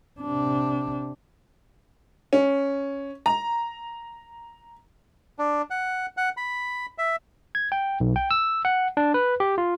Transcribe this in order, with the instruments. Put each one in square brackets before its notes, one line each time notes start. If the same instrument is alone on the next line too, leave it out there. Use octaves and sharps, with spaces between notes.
[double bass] C3 D4
[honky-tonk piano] C#4
A#5
[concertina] D4
F#5
F#5
B5
E5
[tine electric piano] G#6
G5
B1
G5
E6
F#5
D4
B4
G4
F4